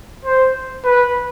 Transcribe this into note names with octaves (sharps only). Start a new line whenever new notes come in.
C5
B4